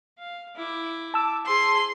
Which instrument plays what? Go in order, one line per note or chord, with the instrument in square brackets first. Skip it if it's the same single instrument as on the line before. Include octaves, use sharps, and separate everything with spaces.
[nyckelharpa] F5
E4 D6
[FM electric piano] A5 E6 [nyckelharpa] D6
[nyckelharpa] G#4 C5 [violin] C6